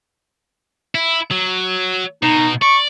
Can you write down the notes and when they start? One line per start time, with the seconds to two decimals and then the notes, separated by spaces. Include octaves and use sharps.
0.95 E4
1.31 F#3
2.23 B2 D#4
2.62 D5 C#6